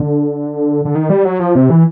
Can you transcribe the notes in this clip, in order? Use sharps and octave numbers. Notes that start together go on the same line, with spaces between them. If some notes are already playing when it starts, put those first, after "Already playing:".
Already playing: D3
D3
D#3
G3
F#3
F3
C3
E3